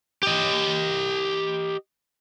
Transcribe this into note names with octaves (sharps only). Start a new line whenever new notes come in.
G4 D#5